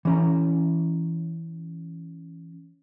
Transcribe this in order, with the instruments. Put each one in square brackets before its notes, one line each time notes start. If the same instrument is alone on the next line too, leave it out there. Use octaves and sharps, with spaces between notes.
[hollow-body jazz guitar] E3 C#4 A#5